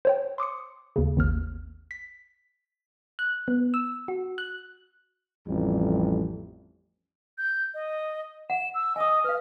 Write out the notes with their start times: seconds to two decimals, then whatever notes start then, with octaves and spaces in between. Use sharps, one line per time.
0.05 C5 C#5 G5
0.38 C6 D6 D#6 C#7
0.96 D#2 C#3
1.17 G#1 D#2 F6
1.91 B6
3.19 F#6
3.48 B3
3.74 E6
4.08 F#4
4.38 F#6
5.46 A1 F2 G3
7.38 G6
7.74 D#5
8.50 F#5 E7
8.74 E6
8.96 D#5 G#5 D#6
9.24 B4 F5 F6